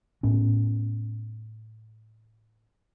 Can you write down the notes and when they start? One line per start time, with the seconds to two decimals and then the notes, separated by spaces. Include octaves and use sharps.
0.23 A2 B3 C#4